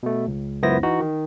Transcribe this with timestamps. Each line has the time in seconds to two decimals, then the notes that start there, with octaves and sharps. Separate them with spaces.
0.03 B2 A3
0.27 C#2
0.62 C#2 F#2 B3 E4 C5 A#6
0.83 E3 D#4 F#4
1.00 D#3